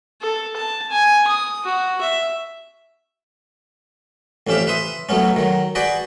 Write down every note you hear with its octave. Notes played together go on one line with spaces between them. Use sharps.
A4
A5
G#5
D#6
F#4
E5
A1 F2 C#4 G4 E5 F5
B4 E5 C6 D#6
F#3 A3 B3 C#4
D#3 F#3
F#4 G#4 B4 D5 G5